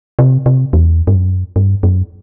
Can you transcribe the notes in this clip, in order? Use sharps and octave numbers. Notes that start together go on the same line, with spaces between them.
C3
C3
E2
G2
F#2
G2
F#2